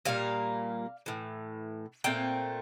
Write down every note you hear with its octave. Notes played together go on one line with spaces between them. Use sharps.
A#2 G3 A#3 F5
A2 E3
A#2 A3 C4 G5